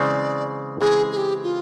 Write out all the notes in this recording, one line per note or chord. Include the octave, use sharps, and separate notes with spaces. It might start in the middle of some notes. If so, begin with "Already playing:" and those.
Already playing: C#3 E3 G#3 C4 D5
C#3 E3 G#3 C4 G#4
G#4
G4
F4